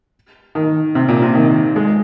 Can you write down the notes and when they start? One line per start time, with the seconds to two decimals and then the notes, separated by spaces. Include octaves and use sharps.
0.55 D#3
0.95 C3
1.08 A#2
1.22 C3
1.35 D#3
1.76 G#3